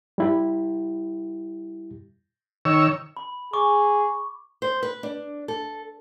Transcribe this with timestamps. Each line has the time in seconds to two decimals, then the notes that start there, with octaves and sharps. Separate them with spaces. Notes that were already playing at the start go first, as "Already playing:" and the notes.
0.18 G3 E4 G4
2.65 D#3 C#5 E6
3.17 B5
3.53 G#4 C#6 D6
4.62 C5
4.83 B4
5.03 D4
5.48 A4